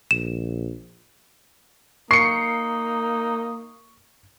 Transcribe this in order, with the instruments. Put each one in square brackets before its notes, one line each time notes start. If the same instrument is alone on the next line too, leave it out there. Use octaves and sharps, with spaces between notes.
[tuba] A#1 [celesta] E7
[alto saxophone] A#3 [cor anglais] D#4 [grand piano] C#6 [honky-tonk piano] C7 C#7